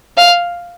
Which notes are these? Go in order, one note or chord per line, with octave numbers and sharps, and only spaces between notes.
F5